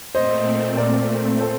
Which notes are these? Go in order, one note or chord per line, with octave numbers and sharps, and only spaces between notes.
A#2 A3 C4 C5 D#5
A#4 D5
A4 C5